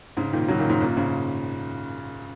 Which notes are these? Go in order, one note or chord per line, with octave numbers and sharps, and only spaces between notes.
G#2 C#3
A#2 D#3
C#3 F#3
A#2 D#3
G#2
F#2 A#2
G#2 C#3